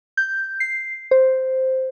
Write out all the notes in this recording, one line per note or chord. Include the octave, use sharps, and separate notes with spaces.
G6
C7
C5